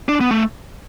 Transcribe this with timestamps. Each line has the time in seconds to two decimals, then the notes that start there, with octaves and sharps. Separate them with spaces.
0.09 D4
0.21 B3
0.31 A3